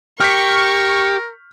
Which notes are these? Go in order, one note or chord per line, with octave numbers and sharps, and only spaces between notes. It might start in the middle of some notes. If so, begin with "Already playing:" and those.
G4 A#4 C#6 F6 G6 B6